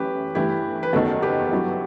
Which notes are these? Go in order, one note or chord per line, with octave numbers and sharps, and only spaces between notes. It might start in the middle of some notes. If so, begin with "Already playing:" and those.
Already playing: F#2 E3 A3 G4 B4
G2 E3 A3 E4 G4
B4
F#1 E2 D#3 F#4 A4
G4 B4
G2 F#3 B3 E4